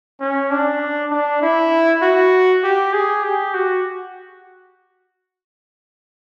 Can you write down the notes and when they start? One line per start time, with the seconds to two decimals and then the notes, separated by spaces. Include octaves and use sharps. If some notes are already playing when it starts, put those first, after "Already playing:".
0.20 C#4
0.51 D4
1.11 D4
1.42 E4
2.02 F#4
2.64 G4
2.93 G#4
3.23 G4
3.54 F#4